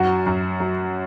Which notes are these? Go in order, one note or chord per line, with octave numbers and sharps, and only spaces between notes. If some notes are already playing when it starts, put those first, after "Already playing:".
Already playing: F#2 F#4
F#2
F#3